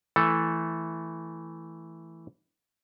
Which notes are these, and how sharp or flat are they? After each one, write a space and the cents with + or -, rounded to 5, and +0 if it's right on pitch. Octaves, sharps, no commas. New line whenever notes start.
E3 +0 A3 +0 A4 +0